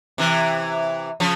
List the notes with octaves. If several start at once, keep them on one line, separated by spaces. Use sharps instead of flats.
C3 E3
C#3 F3